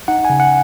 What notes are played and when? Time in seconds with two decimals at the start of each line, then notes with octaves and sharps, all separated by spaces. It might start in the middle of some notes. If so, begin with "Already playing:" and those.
0.08 D#4 F#5
0.25 G#5
0.30 C#3
0.40 F#5